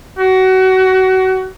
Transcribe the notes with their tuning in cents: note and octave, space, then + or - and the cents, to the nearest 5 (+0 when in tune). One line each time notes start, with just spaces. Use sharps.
F#4 +25